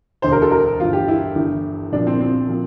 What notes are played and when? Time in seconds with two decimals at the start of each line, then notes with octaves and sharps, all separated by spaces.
0.22 E1 D2 D3 C5
0.32 A#4
0.42 A4
0.51 A#4
0.79 G1 G2 E3 F4
0.93 G4
1.08 E4
1.35 G1 G2 E3
1.92 C2 A#2 F3 D4
2.07 C4
2.21 C4
2.49 A#2 F3